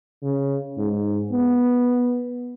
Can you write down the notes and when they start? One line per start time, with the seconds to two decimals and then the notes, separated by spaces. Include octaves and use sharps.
0.23 C#3
0.78 G#2
1.31 B3